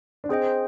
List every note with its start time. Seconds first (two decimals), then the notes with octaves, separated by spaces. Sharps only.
0.24 D4
0.29 C4 G#4 C5 D#5 G5